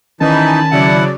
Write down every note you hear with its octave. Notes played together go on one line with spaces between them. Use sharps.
D#3 E3 C#4 D#4 G#5 A5 B5
C#3 F#3 E4 D5 F#5